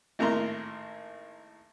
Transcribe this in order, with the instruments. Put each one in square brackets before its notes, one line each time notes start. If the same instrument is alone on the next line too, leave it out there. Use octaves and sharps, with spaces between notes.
[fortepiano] G#1 A2 A#3 E4 A#5 C6